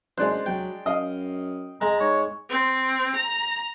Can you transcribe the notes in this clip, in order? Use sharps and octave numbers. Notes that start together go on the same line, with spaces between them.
F#2 G#3 D4 C5 F#6
F#3 G5
F#2 D#5 F5
G#3 A#5
G#2 C#5
C4
A#5